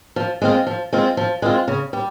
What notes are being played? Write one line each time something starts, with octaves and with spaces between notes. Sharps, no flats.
F3
G#3 C4 F4
F3
G#3 C4 F4
F3
G#3 C4 F4
C#3
G3